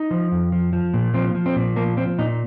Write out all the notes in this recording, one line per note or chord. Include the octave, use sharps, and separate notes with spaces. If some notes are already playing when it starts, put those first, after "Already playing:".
Already playing: D#4
F3
F2
F3
F3
A#2
F3 C4
F3
C4
A#2
F3 A#3
F3 C4
A#2 D#4